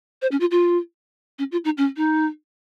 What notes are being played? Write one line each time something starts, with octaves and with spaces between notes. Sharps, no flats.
C5
C#4
F4
F4
C#4
F4
D#4
C#4
D#4